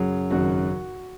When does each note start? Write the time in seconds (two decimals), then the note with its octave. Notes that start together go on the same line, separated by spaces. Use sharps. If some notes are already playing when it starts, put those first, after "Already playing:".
Already playing: F#2 C#3 F#3 G#4
0.30 G#1 F#2 C#3 F#3 F#4